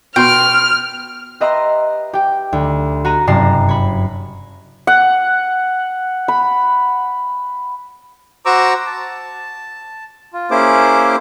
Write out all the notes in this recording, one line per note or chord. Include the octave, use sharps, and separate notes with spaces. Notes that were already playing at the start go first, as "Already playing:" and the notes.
B2 G5 C6 F6
G4 B4 D#5 E5 A#5 C6
G4 G5
D2
F#4 A#5 D#7
F#1 G2 C3 A5 A#5 C7
C#5 B5
F#5
B5
F#4 C5 A#5 C#6 D6 E6
A5
F4
A#3 C#4 E4 G#4 C5 D6